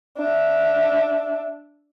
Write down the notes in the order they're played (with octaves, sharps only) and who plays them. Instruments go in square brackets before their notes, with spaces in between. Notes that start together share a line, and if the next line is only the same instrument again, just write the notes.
[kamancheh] D4 E5